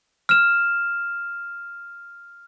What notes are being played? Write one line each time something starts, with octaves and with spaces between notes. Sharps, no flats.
F6 E7